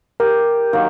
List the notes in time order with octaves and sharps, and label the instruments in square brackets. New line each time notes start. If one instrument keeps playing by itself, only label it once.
[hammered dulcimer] G4 [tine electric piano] A#4
[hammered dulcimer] D#3 F#3 A#3